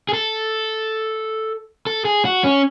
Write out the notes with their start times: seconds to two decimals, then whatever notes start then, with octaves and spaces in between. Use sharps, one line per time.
0.09 G#4
0.13 A4
1.87 A4
2.05 G#4
2.25 F#4
2.44 C#4